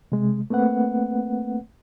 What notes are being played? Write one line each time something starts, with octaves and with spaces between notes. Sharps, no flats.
C3 G#3
A3 A#3 C4 B4 F#5